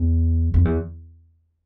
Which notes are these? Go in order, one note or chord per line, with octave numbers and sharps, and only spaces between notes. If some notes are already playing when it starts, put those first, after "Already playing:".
Already playing: E2
F2
E2